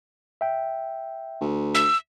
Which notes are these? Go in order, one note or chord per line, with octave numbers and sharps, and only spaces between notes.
E5 G5
D2
E6